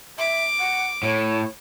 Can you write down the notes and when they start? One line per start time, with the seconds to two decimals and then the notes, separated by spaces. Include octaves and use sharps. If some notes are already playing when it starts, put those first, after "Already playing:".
0.19 E5 D6
0.59 F#5
1.03 A2 C#5